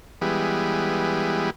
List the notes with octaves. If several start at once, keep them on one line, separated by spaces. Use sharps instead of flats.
E3 G3 G#3 B3